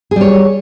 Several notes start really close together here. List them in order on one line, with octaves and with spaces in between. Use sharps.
G#4 G3 C#5